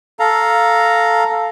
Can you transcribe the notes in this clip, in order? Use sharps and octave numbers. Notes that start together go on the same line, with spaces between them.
A4 F5 A#5